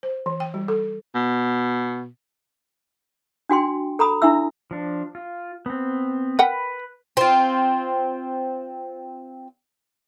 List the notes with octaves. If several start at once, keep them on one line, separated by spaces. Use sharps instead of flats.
C5
E3
G5
G3
A4
B2
D4 F#4 G5 C6
A4 A#5 B5 D#6
D4 E4 E5 E6
F3 D4
F4
B3 C4
A#4 B4 F#5 G5 B5
C4 F4